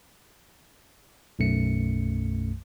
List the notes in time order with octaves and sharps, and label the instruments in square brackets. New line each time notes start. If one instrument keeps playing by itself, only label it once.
[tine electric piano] B1 F#2 A3 C#7